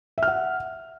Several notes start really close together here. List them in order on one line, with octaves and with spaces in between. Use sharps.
E5 F6 F#5